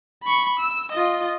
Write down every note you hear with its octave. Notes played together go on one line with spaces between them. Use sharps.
B5 C#6
E6
F4 D#5